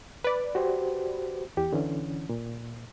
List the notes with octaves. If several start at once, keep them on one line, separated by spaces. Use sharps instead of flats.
B4 D5
F#4 G4 C5
E2 G4
D3 E3 C#4
A#2